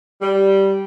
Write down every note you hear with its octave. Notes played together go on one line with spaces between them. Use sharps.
G3